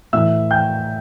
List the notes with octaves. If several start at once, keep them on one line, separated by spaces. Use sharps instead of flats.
A2 E3 E5 E6
G5 G6